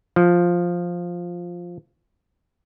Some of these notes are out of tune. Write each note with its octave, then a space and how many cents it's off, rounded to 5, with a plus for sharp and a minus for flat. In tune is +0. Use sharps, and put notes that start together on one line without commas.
F3 +5